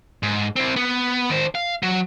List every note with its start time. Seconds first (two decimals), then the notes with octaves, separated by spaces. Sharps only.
0.23 G#2
0.56 C4 E4
0.76 B3
1.30 D#3 C5
1.55 F5
1.83 F#3